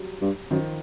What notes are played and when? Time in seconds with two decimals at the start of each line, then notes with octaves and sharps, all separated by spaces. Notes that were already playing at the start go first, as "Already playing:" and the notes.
Already playing: F#3 G3
0.22 G2
0.50 F#2 D#3 F3